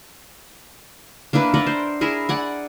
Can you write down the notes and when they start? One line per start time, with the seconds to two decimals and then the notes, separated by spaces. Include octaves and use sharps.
1.33 A#3 D4 E4 B4
1.54 A#4 B4 D5 F#5
1.67 C5
2.01 E4 G#4 A#4
2.29 D5 F#5 G#5